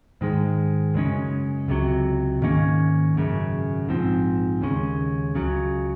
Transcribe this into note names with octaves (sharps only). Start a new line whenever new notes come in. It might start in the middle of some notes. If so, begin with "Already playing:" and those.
G#2 D#3 G#3
F#2 C#3 G#3 C#4
C#2 C3 F#3
G#2 D#3 A#3 C#4
G#1 F#2 C#3
A#1 G#2 F3 C4
D#2 C#3 G#3 C#4
C#2 C#3 F#3